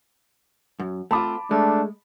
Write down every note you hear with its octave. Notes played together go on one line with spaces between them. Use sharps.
F#2
A3 C4 F4 A5 B5 D6
G#3 A3 D4